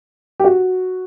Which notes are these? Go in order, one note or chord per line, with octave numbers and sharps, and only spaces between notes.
G4
F#4